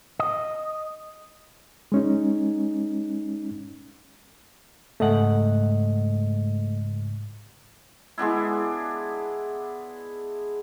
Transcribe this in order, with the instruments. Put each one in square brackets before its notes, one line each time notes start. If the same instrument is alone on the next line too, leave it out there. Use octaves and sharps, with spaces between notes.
[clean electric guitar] D#5
[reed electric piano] G#3 C#4 D#4
[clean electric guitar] C#2 G#2 F#5 [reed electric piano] A3 D#5
[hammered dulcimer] G#3 B3 D4 E4